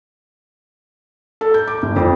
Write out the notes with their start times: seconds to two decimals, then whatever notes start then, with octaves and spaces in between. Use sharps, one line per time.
1.41 A4
1.54 G6
1.67 D6
1.83 G1
1.96 F2